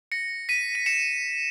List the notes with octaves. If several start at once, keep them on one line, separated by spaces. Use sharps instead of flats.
A#6 C#7
B6 D#7
D#7
C#7 E7